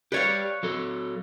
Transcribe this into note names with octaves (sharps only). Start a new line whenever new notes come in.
G4 B4 C#5 D5 F5
F#3 A4